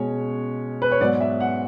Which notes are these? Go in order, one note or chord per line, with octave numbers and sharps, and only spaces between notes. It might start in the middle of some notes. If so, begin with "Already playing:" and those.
Already playing: B2 G#3 C#4 C#5
B4
C#5
G#2 F#3 B3 D5
E5
F#5